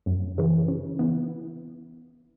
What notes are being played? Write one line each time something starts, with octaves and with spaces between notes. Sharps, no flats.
F#2
C#3 E3
C#3
E3 B3